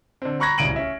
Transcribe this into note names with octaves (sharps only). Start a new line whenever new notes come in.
D3 C4
A#5 B5 C#6 F#6 G#6 A#6
D1 C2 C#3 D7 D#7 F#7
C#4 E5